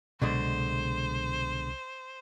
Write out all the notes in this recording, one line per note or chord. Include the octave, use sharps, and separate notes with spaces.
C2 B2 D3 F#3 G#3 C5